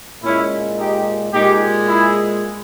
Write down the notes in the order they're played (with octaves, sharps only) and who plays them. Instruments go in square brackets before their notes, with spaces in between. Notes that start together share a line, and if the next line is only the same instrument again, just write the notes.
[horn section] A#2 G#3 C#4 E4
D#4 G4
A#2 G#3 D#4 G4
E4 G#4